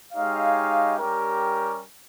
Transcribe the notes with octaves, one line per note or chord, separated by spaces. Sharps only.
G#3 D#4 G4 C#5 F5
G3 C#4 G4 A#4